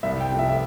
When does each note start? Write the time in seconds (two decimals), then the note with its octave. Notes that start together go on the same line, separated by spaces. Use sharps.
0.03 C2 E5
0.21 G5
0.30 C3 F3 A3
0.39 E5
0.49 E5